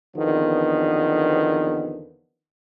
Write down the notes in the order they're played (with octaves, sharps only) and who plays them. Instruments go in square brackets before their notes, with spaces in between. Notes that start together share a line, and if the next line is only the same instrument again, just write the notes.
[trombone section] E2 D3 D#3 F3 B3 C4